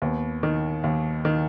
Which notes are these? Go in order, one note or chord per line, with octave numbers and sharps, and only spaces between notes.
D#2 B3
D#3
D#2
D#3